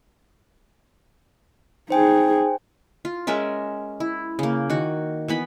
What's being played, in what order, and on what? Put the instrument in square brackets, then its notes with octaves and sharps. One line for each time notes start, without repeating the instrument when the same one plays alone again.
[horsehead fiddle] D#4 G#4 [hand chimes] C5 G5 G#5
[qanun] F4
G#3 C#4 A#4 E5
E4
C#3 A#3
D#3 F#4
E3 B3 B5